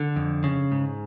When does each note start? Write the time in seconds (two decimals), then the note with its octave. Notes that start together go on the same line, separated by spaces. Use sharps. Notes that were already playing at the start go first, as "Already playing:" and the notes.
Already playing: D3
0.16 F2
0.44 C#3
0.72 G#2